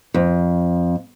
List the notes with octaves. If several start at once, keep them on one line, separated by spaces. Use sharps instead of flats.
F2